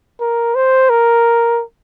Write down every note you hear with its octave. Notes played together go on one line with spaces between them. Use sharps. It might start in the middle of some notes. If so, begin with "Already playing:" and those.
A#4
C5
A#4